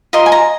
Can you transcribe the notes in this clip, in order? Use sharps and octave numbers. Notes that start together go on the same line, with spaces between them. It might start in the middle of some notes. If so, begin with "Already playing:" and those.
F4 A#4 D#5 C6
G#5
A#5